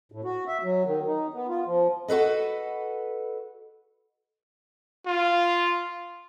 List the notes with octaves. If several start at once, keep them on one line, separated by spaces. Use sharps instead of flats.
A2
F#4
E5
F#3
D#3
D#4
B3
F4
F3
F#4 A4 B4 D#5
F4